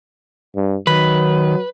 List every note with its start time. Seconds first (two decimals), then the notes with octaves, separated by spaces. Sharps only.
0.56 G2
0.87 D#3 F#3 B4